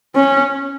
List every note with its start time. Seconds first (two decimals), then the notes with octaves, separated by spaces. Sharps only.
0.15 C#4